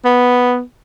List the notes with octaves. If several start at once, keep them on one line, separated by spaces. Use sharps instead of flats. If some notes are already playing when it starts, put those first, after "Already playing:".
B3